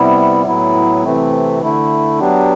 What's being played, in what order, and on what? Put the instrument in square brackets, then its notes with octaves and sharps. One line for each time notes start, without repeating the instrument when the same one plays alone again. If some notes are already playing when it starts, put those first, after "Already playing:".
Already playing: [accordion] C3 G3 B3 E4
A2 F#3 B3 E4
C3 E3 A3 C4
D3 A3 E4
F#3 B3 D4 G4